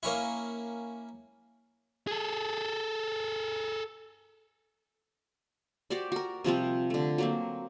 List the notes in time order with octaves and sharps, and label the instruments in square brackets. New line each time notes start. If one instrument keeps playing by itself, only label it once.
[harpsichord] A#3 C#4 E4
[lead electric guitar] G#4 A4
[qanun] F#4 G4 C5 D5
F#4 A#4
C3 F3 G3 C4
D3 A3
F#3 A#3 C4